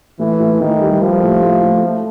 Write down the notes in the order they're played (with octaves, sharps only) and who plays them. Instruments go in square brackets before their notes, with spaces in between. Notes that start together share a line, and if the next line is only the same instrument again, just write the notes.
[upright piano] A2 [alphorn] E3
[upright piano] A2
[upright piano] A2 [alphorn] D#3
[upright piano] G3
[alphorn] F3 [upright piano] G3
[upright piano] A2
A2
A2
A3